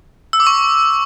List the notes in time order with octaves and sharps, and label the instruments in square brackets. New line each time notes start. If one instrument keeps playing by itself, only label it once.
[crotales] E6
D6
C#6